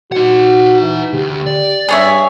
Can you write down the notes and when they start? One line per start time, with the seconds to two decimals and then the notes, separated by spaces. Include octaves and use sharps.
0.12 D#4 F#4 F#5
0.81 E3
1.13 D2 G4
1.46 D5
1.89 G2 G#4 C#5 E5